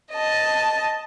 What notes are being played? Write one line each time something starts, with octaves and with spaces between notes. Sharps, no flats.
D#5 A5